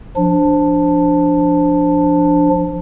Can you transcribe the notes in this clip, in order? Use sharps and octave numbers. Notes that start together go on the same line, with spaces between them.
F3 D4